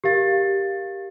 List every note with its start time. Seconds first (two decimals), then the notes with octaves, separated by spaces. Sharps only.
0.04 G4 A#4 F5 A6